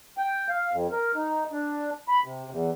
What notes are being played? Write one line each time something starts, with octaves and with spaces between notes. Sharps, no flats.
G5
F5
F2
A#4
D#4
D4
B5
C3
E2